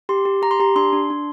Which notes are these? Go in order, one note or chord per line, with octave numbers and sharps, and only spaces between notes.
G4 C6
G4
G4 A#5
C6
G4 A#5
D4 C6
D4
D4